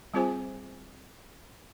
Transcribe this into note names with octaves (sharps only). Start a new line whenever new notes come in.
G3 C4 F4 G#4 C5 G#5